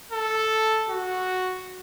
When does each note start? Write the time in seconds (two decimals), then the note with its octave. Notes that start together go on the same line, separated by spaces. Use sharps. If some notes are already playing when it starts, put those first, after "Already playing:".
0.12 A4
0.89 F#4